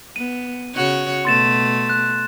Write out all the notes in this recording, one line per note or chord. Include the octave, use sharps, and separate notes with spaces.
B3 D#7
C#3 F#4 C#5
B2 A3 C6 A6 E7
F#6